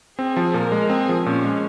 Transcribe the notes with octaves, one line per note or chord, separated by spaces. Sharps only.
C4 G#4
F3
A#2 A#4
G#3
C4 G#4
F3
A#2 C#4
G#3